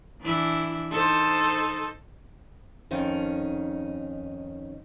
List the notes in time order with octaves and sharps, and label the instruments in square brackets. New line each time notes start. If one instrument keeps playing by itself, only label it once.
[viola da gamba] E3 D4 E4
D#4 A4 C5
[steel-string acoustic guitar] F2 D#3 C#4 D#4